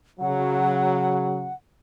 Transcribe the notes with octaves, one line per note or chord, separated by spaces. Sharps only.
C#3 F#3 F#5